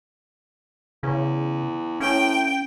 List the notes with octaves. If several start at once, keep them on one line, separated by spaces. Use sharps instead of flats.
E2 C#3
A2 C#4 G5